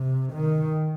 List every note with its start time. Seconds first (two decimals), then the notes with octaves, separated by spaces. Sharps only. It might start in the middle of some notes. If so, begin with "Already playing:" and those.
Already playing: C3
0.33 D#3